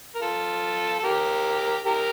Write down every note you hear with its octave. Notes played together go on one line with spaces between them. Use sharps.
A#4
F4 A4
A4
G4 A#4
G4 A#4